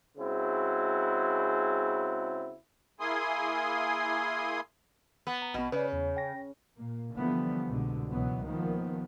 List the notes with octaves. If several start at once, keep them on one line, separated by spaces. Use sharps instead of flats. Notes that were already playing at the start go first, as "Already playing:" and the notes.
C#3 G#3 C4 E4 F#4
A#3 E4 G#4 G#5 C6 D#6
B3
A#5
A#1 B2 B3
C#3 B4 C#5 D5
E2
G5 A#6
A#2 A#3
D3 E3 F3 G3 A3 B3
C2 G#2 B2 D3
C#2 B2 E3 F#3 B3
D#3 F3 A#3 B3